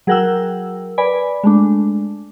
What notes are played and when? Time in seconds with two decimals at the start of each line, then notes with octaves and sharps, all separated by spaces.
0.07 F#3 G#4 A#4 F#5 G5 E6
0.98 B4 D5 G#5 B5
1.43 G#3 A3 D4